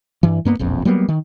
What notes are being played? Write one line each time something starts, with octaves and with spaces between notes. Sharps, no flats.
G2 E3
G2 A#3 B3
E1 A#1 F2
F#3 G3 A#3 B3
D#3